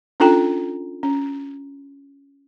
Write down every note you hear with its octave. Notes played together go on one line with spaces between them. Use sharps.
C#4 D4 F4 A4 G5 A#5
C#4